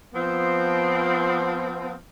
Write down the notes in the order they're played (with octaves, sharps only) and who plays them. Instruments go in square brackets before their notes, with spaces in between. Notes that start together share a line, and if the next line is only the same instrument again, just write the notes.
[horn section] F3 B3 C4